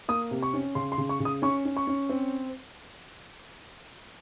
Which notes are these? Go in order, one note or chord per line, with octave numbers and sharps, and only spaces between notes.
A#3 D#6
C3
C#6
C#4
C#3 C6
C6
C#3
C#6
C#3
D#6
C#4 C#6
C#4
C#6
C#4
C4